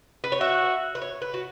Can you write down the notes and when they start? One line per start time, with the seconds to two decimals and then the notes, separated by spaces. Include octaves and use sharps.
0.24 B4
0.32 C#5
0.40 F#4 E5
0.95 B4
1.02 C#5
1.22 B4
1.34 F#4